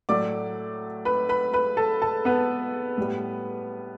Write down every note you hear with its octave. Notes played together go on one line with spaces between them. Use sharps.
A2 F#3 A3 D5 D6
B4 B5
B4 B5
B4 B5
A4 A5
A4 A5
B3 B4
A2 G3